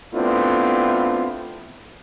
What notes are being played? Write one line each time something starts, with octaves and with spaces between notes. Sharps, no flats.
A3 B3 C4 D4 E4 F4